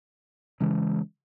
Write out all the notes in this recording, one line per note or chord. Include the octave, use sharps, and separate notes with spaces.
C#3 E3 G#3